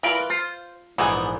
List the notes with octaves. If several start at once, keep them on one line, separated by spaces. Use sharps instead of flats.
E3 F4 A#4 B4 D5
F4 C5
A#1 G#2 E3 B3 G#4